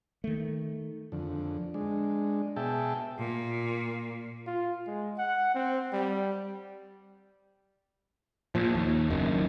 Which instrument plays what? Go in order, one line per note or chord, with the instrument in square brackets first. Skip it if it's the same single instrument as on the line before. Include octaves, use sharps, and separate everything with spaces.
[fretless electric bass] D#3 A3
[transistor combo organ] F2 D3
G#3 D4
B2 G#4 E5 G5 A5
[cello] A#2
[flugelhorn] F4
G#3
F#5
C4
G3
[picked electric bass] A#2 F3
D#2
F#1 F#2 D#3